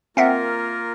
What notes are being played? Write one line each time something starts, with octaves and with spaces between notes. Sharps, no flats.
A#3 C4 F4 A#4 E5 F#5